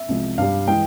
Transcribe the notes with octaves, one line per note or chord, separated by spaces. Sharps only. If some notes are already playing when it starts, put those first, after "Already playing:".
Already playing: E5
C2 C3 F3 G#3
G2 G3 F5
E3 G#3 G5